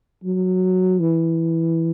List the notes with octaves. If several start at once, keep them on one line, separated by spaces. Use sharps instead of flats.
F#3
E3